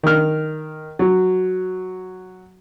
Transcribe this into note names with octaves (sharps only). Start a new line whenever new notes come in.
D#3 F6
F#3